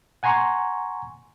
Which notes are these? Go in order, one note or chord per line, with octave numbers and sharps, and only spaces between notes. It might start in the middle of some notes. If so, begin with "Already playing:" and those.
F#5 G#5 A#5 C6 C#6